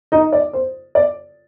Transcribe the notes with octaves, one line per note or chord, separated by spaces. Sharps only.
D#4 D#5
D5
C5
D5